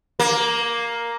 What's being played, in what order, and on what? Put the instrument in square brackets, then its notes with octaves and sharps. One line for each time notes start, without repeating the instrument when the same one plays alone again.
[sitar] A#3